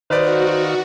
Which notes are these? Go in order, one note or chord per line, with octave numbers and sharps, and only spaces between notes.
D#3 D#4 F#4 B4 C5 D5 F5